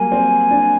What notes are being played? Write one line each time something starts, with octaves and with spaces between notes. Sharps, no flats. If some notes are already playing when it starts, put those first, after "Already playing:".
Already playing: F#3 G3 A#3 G#5
C4
D4